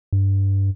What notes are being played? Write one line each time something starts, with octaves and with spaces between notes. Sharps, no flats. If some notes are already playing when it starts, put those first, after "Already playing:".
G2